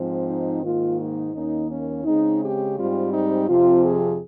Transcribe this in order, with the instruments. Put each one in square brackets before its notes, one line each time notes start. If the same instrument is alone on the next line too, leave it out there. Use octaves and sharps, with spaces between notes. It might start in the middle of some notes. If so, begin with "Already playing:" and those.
Already playing: [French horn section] G#2 F3 C4
D#4
G#2 D#3 A#3 F4
D#4
D#2 D#3 A#3 C#4 D#4
C#4
C#3 G#3 C4 D#4
G4
G#2 G3 C4 F4
D#4
F2 C3 F3 C4 F4
G#4